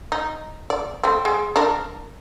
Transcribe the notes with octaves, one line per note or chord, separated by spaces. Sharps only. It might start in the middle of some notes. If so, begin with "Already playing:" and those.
D#4
D5
A3 C4
G#3
D4 A#4